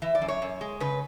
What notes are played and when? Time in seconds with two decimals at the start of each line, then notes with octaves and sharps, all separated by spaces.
0.02 E3 E5
0.15 D5
0.22 F#2
0.28 C#5
0.42 F#2
0.61 G#3
0.80 C#3 B4